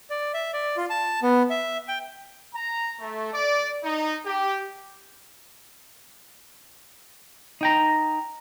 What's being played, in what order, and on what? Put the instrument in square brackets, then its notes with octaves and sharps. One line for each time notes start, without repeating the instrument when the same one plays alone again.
[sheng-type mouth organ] D5
E5
D5
F4
A5
B3
E5
G5
[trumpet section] A#5
A3
D5
D#4
G4
[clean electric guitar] D#4 G5 A#5